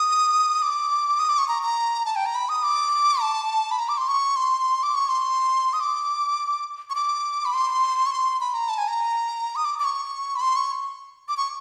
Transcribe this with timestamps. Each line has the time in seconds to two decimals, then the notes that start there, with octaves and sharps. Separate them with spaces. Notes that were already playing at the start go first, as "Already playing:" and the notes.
Already playing: D#6
0.62 D6
1.19 D#6
1.29 D6
1.38 C#6
1.48 A#5
1.63 A#5
2.06 A5
2.16 G5
2.26 A#5
2.35 B5
2.49 D#6
2.63 D6
3.21 A5
3.71 B5
3.79 A#5
3.89 D6
3.98 C6
4.08 C#6
4.36 C6
4.83 D6
4.95 C#6
5.09 C6
5.73 D#6
5.80 D6
6.90 C#6
6.95 D6
7.45 B5
7.54 C6
8.06 C#6
8.11 C6
8.41 B5
8.54 A#5
8.69 A5
8.78 G#5
8.88 A#5
9.56 D#6
9.65 D6
9.79 D6
9.84 C#6
10.36 B5
10.41 C6
10.56 C#6
11.28 D6
11.37 C#6